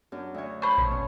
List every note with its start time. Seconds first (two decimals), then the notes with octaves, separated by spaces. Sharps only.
0.12 F#2 D4
0.34 D2 C#5
0.62 C5 A5 B5 C#6
0.78 A1 B2 C#5
0.91 C#4